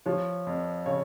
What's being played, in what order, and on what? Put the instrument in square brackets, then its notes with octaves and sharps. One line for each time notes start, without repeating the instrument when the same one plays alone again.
[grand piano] F3 [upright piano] C#5
[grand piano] F2
[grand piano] C#3 [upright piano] C#5